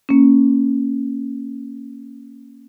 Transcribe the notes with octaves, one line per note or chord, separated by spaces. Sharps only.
A#3 C#4